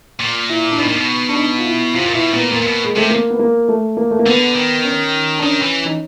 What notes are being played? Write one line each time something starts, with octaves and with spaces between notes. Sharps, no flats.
A#2
E4
D4
B2 D#4
A#2
B2
D4
D#4
F4
E4
C3 F4
A#2
B2 E4
A#2 B3
A#2 A#3
A#2
B2
G#3
C3 A3
A#3
B3
A#3
A3
A#3
A3
A#3
D3 B3
D#3
C#4
D4
D#3 C#4
E3
D#4